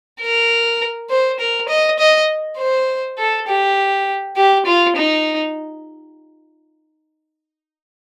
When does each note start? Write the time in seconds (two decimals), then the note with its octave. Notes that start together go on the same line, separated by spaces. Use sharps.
0.21 A#4
1.10 C5
1.39 A#4
1.69 D#5
1.99 D#5
2.58 C5
3.18 A4
3.48 G4
4.36 G4
4.66 F4
4.96 D#4